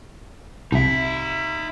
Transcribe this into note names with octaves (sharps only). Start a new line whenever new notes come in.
C2 D#4 E5